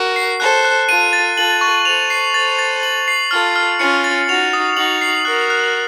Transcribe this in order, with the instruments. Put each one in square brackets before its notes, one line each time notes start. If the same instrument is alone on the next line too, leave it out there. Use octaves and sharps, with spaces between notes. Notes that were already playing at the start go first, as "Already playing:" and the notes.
Already playing: [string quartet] F#4 A#4
[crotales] C7
[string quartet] A4 C5 [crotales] F#6
[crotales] F#6
[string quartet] F4 A4 [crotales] D#7
[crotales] A6
[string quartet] F4 A4 [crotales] F#7
[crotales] C#6
[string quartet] A4 C5 [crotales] F7
[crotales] C7
[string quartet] A4 C5 [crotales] A6
[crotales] A6
F#7
C7
[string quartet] F4 A4 [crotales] F6
[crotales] F6
[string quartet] C#4 F4 [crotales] C#7
[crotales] A6
[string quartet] D#4 F#4 [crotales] F7
[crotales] D#6
[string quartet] D#4 F#4 [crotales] F#7
[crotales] C7
[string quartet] F#4 A#4 [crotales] F#6
[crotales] F#6